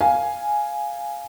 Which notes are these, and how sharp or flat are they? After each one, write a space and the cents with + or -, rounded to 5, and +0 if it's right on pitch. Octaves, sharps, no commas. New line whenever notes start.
A#4 +10 F5 +0 G#5 +0